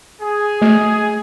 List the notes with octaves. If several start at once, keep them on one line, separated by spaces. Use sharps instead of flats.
G#4
A3